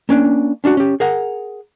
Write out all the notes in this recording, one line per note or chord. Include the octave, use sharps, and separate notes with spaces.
A#3 C#4 D4
C#4 D4 F4 F#4
C#4 G4
G#4 A#4 F#5